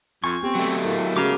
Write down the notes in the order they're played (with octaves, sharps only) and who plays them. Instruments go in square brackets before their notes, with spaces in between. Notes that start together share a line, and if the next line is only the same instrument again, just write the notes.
[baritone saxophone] F2 [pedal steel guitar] G#5 C#6
[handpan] B3 G4 [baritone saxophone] C4
[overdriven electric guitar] F#3 A3
[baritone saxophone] A2 [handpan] A4 A#4 F5
[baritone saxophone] C#3 [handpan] G#3 F#4 G#4 [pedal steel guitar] A#5 D6